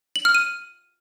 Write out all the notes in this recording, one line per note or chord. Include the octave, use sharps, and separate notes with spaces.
F#7
F6
D#7